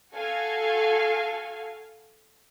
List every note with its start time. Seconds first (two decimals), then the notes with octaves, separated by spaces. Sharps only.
0.12 F#4 A4 F5 G#5